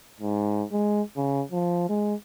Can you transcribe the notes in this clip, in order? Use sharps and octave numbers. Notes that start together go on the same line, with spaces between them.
G#2
G#3
C#3
F3
G#3